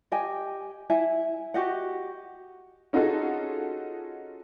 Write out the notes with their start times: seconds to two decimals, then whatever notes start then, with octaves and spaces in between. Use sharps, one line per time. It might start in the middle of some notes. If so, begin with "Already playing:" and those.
0.12 G4 D#5 G5 G#5
0.90 E4 E5 G#5
1.54 F#4 G4 D#5 F#5
2.93 C#4 D#4 F4 F#4 G#4 A4